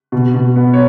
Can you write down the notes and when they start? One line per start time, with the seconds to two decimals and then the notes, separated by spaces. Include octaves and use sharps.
0.12 B2
0.34 B2
0.56 B3
0.73 C#5